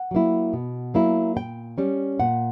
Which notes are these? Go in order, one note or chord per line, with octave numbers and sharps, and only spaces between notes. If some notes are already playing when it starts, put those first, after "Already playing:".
Already playing: F#5
F#3 A#3 E4
B2
F#3 A#3 E4
A#2 G5
G3 C#4
A#2 F#5